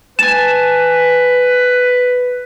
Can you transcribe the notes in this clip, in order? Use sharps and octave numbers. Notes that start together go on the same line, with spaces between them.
B4 G#5 A5 E7